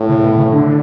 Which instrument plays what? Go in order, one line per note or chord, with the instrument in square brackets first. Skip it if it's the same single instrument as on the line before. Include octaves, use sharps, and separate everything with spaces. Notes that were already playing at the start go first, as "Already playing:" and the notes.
Already playing: [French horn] A2
[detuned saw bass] C#3
B2
C#3
D3